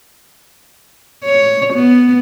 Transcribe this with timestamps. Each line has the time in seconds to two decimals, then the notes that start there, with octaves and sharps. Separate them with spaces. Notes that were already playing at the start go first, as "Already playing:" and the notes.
1.24 C#5
1.74 B3